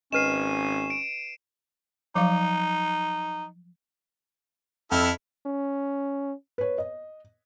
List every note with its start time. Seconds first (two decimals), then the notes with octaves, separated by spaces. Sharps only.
0.12 G#1 C#4 B4 D#5 C7 D#7 E7
0.90 D7
2.15 F3 F#3 D#4 F5
4.91 F2 E4 A4 F6
5.46 C#4
6.58 B4 C#5
6.78 D#5